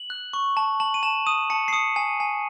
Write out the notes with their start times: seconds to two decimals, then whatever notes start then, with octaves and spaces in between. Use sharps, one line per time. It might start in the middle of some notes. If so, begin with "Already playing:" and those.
Already playing: F#7
0.10 F#6
0.33 C#6
0.57 A5
0.80 A5 F#7
0.94 D#7
1.03 A5 E7
1.27 D#6 D#7
1.50 A5 C#7
1.68 C7
1.73 D#6 C#7
1.96 G#5
2.20 G#5